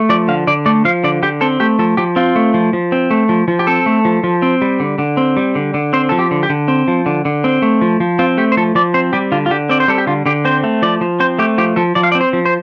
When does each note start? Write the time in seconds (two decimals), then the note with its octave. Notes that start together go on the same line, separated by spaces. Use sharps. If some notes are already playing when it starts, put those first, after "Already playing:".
Already playing: A3
0.09 F3 D5
0.28 D3 F5
0.47 D3 D5
0.66 A3 D5
0.85 F3 F5
1.04 D3 D5
1.22 D3 G4
1.41 C4 A4
1.60 A3 G4
1.79 F3 A4
1.97 F3 G4
2.16 C4 F4
2.36 A3
2.54 F3
2.73 F3
2.92 C4
3.11 A3
3.29 F3
3.48 F3
3.59 G4
3.67 C4 A4
3.86 A3
4.05 F3
4.24 F3
4.42 C4
4.62 G3
4.80 D3
4.98 D3
5.17 C4
5.37 G3
5.55 D3
5.74 D3
5.93 C4 C5
6.09 F3 A4
6.19 G4
6.31 D3
6.43 G4
6.50 D3
6.68 C4
6.88 F3
7.06 D3
7.25 D3
7.44 C4
7.62 A3
7.81 F3
8.00 F3
8.19 C4 F4
8.38 A3 G4
8.52 C5
8.57 F3 A4
8.75 F3 D5
8.94 C4 C5
9.13 G3 G4
9.32 D3 F4
9.46 F4
9.51 D3 G4
9.69 C4 D5
9.80 C5
9.88 G3 A4
9.98 G4
10.07 D3 F4
10.26 D3 G4
10.45 C4 C5
10.64 A3
10.82 F3 D5
11.01 F3
11.20 C4 C5
11.39 A3 G4
11.58 F3 G4
11.76 F3 A4
11.95 F3 D5
12.03 F5
12.12 D5
12.15 C4
12.21 C5
12.33 F3
12.45 C5